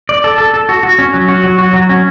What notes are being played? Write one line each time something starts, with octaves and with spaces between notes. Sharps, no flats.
D5
A4
A4
A4
F#4
F#4
C#4
F#3
F#4
F#3
F#4
F#3
C#4